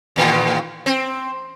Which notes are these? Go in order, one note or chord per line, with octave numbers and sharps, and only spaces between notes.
E2 A2 D#3
C4